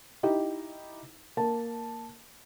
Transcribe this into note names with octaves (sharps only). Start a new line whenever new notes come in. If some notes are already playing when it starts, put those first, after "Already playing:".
D#4 E4 G4
A#3 A5